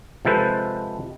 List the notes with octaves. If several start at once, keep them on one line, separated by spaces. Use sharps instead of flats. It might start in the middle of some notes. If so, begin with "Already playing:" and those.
C3 F3 G#3 A4 B4 C5